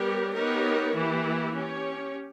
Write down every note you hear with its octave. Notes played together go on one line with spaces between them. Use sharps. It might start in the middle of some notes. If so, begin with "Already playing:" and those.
Already playing: G3 B3 G4 A#4 C#5
B3 D#4 G4 A#4 C#5
E3 A#3 E4 G4
C#4 G4 C#5